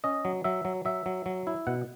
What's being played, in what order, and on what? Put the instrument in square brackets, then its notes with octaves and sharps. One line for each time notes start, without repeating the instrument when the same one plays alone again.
[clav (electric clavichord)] C#4 D#5
F#3
F#3 E5
F#3
F#3 E5
F#3
F#3
E4
B2 F#5